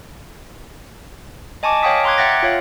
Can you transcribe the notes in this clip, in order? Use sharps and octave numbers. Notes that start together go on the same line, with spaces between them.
D#5 G#5 A5 C#6 D6
C#5 F5 G5 C#6 D#6 B6
A#5 C6 D6 F#6 G#6
E5 F#5 G5 F#6 A6 A#6
F4 C#5 F5